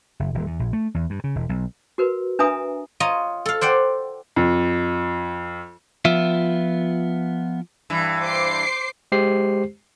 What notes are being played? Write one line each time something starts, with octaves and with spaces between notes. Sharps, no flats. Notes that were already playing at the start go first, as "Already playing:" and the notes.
F#1
D#1
E2
A#1
A3
E2
G2
C#3
E1
B1
F#4 A#4 B4
D4 B4 E5 G#5 A#5 D#6
F4 C#5 D#5 A#5
A4 F5
C5 D5 F#5 G5
F2
F3 B3 F4 E5
G2 E3
C5 D6 C7
G#3 G4 C5 C7